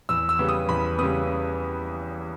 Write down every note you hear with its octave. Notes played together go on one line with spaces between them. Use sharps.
E2 E6
E6
C#3 G3 B3
D#6
E2 B5
C#3 G3 B3 D#6